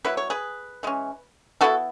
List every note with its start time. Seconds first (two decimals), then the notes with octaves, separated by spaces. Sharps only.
0.04 F#3 B3 E4 B4
0.17 C#5
0.30 G#4 B4
0.83 E3 G#3 C#4
1.61 E3 B3 E4 F#4 A4